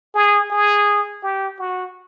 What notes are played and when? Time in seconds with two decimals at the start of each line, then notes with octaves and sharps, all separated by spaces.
0.15 G#4
0.51 G#4
1.23 G4
1.59 F#4